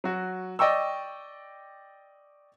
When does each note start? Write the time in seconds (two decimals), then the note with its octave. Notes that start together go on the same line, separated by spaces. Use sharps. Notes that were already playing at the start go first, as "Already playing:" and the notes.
0.04 F#3 F#4
0.59 D5 D#5 G5 C#6 E6